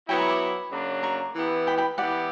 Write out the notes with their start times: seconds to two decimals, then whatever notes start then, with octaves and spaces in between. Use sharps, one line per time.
0.09 F#3 B3 E4 G5 B5
0.19 A#5 C#6
0.29 B5 D6
0.72 C#3 F#3 A#3 D4
1.03 A#5 C#6
1.35 E3 B3 E4 G4
1.67 G5 B5
1.78 G5 B5
1.98 E3 B3 E4 G4 D5 F#5